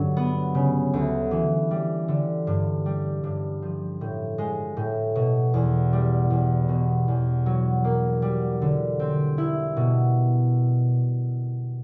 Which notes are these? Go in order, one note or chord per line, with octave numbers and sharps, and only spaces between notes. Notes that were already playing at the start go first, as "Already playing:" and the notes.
Already playing: G2 D3 F#3
B3
C#3
D2
E3
G3
D3
G2
G3
G2
F3
A2
G#3
A2
B2
E2
G3
E2
B2
E2
F#3
A#3
G3
D3
C4
E4
B2